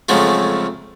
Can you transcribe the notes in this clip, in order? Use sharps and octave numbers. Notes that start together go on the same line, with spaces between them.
F2 C#3 F3 F#3 G#3 A3